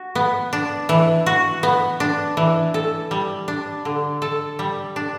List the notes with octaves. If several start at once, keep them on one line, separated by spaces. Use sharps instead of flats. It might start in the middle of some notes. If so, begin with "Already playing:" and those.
Already playing: F#4
B3
D4
E3
F#4
B3
D4
E3
A4
G3
D4
D3
A4
G3
D4